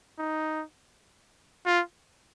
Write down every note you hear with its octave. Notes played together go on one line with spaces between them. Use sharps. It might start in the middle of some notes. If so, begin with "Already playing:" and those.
D#4
F4